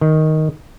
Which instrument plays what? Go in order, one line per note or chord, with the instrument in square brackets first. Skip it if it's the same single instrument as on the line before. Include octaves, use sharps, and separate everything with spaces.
[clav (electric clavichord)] D#3